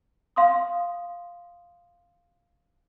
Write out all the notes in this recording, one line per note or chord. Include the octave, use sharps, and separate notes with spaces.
F5 C6 D#6